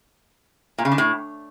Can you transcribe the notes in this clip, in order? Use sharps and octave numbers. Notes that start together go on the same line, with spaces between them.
A#2
C#3
D3
A2